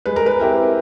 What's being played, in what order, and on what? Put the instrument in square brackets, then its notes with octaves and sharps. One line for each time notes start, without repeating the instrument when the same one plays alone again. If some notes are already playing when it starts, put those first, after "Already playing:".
[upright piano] G#3 [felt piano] B4
[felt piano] A#4
B4
[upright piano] C4 E4 G4 A#4